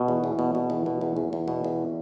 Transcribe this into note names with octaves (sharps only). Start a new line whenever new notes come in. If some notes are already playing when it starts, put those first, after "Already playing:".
Already playing: B2
E2
E2
B2
B2
E2
B2
E2
E2
E2
B2
E2